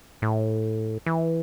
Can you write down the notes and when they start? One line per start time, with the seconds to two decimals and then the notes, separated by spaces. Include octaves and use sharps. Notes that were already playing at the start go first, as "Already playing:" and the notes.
0.22 A2
1.06 E3